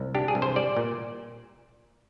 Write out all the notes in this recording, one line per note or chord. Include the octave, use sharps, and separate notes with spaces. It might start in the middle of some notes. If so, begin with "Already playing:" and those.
Already playing: C2
D4 G4
G#4
C2
C5
G3 D5
A#2